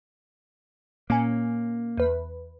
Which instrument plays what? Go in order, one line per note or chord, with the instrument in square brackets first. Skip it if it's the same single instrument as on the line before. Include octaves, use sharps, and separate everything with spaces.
[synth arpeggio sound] A#2 C#4 G#5 [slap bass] A#3
[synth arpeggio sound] E2 B4